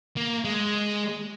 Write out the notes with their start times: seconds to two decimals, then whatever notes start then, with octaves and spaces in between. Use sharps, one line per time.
0.17 A#3
0.45 G#3